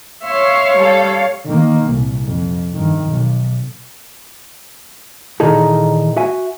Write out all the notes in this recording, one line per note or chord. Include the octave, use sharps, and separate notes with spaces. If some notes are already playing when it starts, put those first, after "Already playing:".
C#5 E5 F5 C6 C#6
G3 A4
D#3 A#3
C2 A#2
F2
G2 D#3
B1
A#2 D#3 E3 D#4 G#4 A4
F#4 E5 G#5